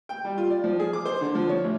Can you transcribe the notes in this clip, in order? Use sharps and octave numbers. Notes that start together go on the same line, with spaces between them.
G5
G3
F4
D5
F3
G#4
D6
C5
D3
F3
C#5
A1